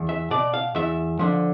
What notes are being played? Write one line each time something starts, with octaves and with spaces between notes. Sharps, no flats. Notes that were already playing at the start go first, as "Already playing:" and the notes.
Already playing: E2
E5
B2 D5
F5
E2 E5
D3 F3